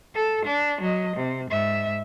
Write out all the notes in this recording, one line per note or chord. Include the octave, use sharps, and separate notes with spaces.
A4
D4
F#3 D#5
C3
G#2 E5